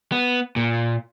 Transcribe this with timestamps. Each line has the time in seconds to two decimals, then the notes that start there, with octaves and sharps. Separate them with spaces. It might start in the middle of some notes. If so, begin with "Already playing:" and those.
0.12 B3
0.56 A#2